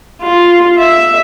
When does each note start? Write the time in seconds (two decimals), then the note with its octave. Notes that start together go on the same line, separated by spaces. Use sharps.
0.22 F4
0.79 E5